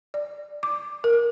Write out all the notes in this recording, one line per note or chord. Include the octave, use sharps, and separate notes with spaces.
D5
D6
A#4